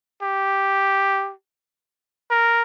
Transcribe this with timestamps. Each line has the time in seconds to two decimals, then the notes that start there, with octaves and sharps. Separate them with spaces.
0.23 G4
2.31 A#4